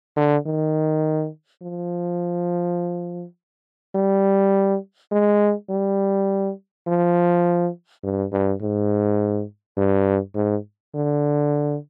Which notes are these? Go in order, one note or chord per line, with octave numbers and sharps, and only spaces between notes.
D3
D#3
F3
G3
G#3
G3
F3
G2
G2
G#2
G2
G#2
D3